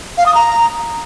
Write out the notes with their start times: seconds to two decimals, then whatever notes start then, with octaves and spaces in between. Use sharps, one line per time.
0.17 F5
0.26 D#6
0.34 A#5